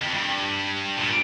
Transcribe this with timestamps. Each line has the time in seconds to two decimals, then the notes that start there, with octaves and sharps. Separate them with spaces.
0.02 F2
0.14 G2
0.97 A#2